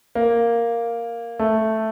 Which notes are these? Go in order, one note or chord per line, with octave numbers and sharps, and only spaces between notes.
A#3
A3